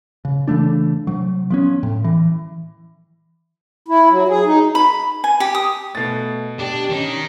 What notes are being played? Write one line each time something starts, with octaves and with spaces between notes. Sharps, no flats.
C#3
C#3 E3 A3 D4
C3 F#3
F3 B3 C#4
A2
E3
E4
F#3
G#4
D#4
B5
G#5
G4
D#6
B2 A3 A6
D4 G4
D#3 C#4 D#4